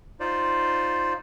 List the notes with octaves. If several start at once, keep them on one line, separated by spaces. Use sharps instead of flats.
D#4 F4 C5 D5